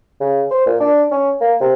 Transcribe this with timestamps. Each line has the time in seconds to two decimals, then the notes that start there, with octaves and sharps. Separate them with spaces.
0.20 C#3
0.51 C5
0.66 A#2
0.81 D4
1.11 C#4
1.41 A#3
1.61 C3